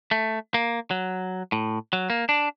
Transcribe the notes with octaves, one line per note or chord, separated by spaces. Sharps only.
A3
A#3
F#3
A2
F#3
A#3
D4